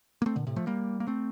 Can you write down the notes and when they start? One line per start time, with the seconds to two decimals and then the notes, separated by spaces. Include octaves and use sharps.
0.22 A#3
0.26 A3 C4
0.36 A#2 D3
0.47 A2 C3
0.56 F3 A3
0.67 G3 A#3
1.00 A#3
1.07 A3 C4